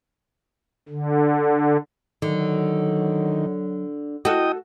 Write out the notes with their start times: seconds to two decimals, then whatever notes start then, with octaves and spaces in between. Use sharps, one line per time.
0.89 D3
2.22 D3 D#3 F#3
4.25 E4 F#4 A4 D#5 G5 D#6